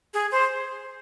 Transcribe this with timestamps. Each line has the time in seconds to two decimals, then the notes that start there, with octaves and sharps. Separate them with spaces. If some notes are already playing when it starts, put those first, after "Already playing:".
0.14 G#4
0.32 C5